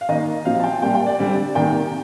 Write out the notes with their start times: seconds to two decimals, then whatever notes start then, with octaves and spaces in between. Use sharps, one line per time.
0.01 F5
0.09 D#3 A#3 D#5
0.45 A#2 F3 C4 F5
0.60 A5
0.64 G5
0.82 A#2 G3 A#3 G5
0.95 G5
1.06 D5
1.19 D3 G3 C4 D5
1.55 C3 D#3 A#3 G5